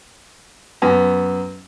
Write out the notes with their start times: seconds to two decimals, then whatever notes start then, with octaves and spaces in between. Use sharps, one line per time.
0.82 F#2 B3